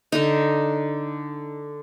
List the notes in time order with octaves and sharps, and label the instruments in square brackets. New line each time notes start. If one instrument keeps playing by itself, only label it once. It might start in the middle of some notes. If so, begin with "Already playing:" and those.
[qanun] D3 D#4